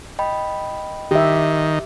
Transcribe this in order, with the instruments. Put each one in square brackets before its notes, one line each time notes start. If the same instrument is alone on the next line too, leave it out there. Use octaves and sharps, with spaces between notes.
[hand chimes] D#5 G5 B5
[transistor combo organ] D#3 [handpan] G4 E5